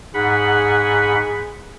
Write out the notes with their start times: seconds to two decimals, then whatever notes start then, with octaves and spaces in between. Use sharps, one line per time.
0.14 G#2 G#4 F#5 B5